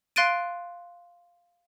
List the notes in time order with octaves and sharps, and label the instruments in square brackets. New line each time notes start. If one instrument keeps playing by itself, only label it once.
[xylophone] F5 C6 F#6 A6 D7 D#7